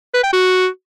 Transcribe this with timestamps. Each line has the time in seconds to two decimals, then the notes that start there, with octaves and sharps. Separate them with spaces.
0.14 B4
0.24 G5
0.33 F#4